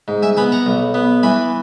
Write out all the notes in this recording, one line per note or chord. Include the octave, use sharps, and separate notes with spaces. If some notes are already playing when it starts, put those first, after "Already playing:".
G#2
E5 G#5
B3 G#5 B5
F#5 A#5
B1
B3
E3 G#5 B5